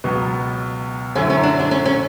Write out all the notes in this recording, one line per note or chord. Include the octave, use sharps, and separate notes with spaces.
C#2 B2 F#3 B3
F#2 D3 F#3 A3 C#4 E4
C#4
D4
D4
C#4
C#4